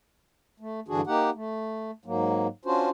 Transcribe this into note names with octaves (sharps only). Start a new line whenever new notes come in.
A3
G2 D3 E3 D4 F#4 G#4
A#3 D#4 G4 F#5
A3
G#2 F#3 A#3
C#4 D4 F4 F#4 C5